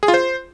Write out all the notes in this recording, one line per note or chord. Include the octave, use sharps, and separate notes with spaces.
G#4
F4
C5